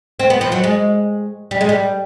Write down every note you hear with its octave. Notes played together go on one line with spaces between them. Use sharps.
C4
B3
F3
F#3
G#3
G3
G#3
G3